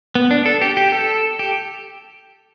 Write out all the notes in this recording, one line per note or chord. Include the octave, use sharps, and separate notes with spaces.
B3
D4
A4
G4
G4
A4
G4